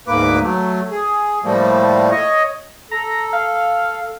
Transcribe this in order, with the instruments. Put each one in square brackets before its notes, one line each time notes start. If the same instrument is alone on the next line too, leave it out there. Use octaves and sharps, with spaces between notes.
[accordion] D2 G#2 A#3 B4 D6
F#3 A3
G#4
A2 F3 G3 A3 A#3
C#5 D#5
[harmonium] A4 [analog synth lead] A#5
[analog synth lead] F5